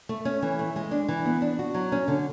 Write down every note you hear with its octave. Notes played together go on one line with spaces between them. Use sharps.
A3
C#4
E3
A3
G#3
D4
E3
B3
D4
F#4
F#3
C#4
D3